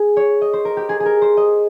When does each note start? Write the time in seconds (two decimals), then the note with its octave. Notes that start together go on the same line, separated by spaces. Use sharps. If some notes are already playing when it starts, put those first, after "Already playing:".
Already playing: G#4
0.17 C#5
0.41 D#5
0.53 C5
0.65 A#4
0.77 G4
0.89 G#4
1.00 G#4
1.06 A#4
1.22 C5
1.37 D#5